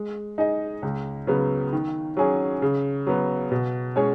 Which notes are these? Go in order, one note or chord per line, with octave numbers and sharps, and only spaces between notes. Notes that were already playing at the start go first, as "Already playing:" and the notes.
Already playing: G#3
D#4 G#4 D#5
C#2
C#3 F#3 B3
D#3
F#3 C#4 G#4
C#3
F#3 B3
B2
G#3 C#4 G#4 C#5